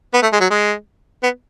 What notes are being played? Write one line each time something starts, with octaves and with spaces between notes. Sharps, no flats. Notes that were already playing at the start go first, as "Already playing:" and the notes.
B3
A3
G#3
F#3
G#3
B3